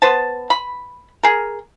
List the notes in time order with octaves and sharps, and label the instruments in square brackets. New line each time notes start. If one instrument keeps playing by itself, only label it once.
[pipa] B3 B4 C5 A5
B5
G#4 A#4